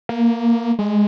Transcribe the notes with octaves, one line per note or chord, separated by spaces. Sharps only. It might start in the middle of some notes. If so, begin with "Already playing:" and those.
A#3
G#3